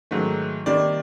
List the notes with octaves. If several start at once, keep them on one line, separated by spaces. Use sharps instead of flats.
G#2 D#3 F#3 A3
C3 D#3 G3 A#3 D5